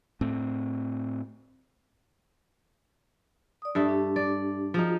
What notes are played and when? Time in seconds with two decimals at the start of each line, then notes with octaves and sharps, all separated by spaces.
0.21 A2 A3 C4
3.62 D5 D#6
3.75 G2 A4 E5
3.89 D4 G4
4.16 D5
4.74 F3 D#4 F4 F#4 G#4